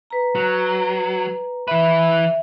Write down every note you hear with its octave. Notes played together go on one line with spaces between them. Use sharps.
B4 A#5
F#3
E3 B4 E5